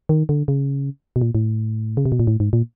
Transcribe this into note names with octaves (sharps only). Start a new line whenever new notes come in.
D#3
D3
C#3
B2
A#2
A2
C#3
C3
B2
A#2
A2
G#2
A#2